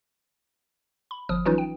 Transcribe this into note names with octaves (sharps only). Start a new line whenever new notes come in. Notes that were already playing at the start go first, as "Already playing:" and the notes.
B5
G1 F3 D#6 F6
E3 F#3 C#4 D#4 F4 B4
G5